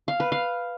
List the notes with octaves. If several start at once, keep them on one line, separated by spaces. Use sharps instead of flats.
F5
B4
F5